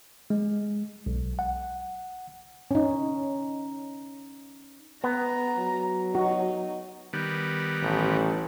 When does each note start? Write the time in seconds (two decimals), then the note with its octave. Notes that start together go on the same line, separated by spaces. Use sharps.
0.30 G#3
1.06 B1
1.39 F#5
2.71 C#4 D#4
5.04 B3 A#5
5.59 F#3
6.15 D#4 F#4
7.13 D#3 G3 B3
7.82 A1